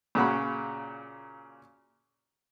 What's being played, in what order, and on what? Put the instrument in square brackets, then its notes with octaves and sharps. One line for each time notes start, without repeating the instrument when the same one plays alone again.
[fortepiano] A#2 C#3 F#4 B5